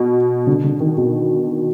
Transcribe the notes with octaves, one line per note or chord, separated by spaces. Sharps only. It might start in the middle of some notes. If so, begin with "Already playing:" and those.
Already playing: B2
D3
D3
D#3
B2